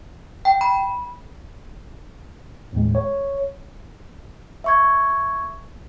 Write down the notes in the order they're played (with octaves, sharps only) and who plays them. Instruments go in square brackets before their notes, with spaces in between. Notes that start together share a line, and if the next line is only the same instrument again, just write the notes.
[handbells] G5
B5
[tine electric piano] D#2 A2 G#3
C#5
[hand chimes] E5 C#6 G#6